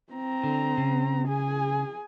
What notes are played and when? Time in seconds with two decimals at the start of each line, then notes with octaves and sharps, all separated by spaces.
0.13 C4 A#5
0.44 D3
0.78 C#3
1.28 G#4 G#5